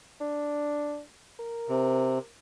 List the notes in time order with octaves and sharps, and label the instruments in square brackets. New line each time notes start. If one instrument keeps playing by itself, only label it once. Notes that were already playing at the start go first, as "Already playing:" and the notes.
[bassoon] D4
A#4
[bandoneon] C3